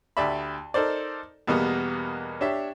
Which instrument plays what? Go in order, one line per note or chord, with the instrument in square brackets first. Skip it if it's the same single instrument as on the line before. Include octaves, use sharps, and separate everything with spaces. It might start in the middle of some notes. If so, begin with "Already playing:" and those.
[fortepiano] D2 G4 D5 E5 B5
D#4 A4 A#4 C5 D5
E2 B2 G3 A#3 B3
D4 G4 C#5 E5